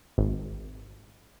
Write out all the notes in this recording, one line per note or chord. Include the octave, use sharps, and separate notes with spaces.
G#1